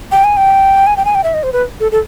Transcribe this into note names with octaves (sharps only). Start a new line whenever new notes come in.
G5
G#5
G5
G#5
G5
G#5
G5
E5
D#5
C5
B4
A4
A4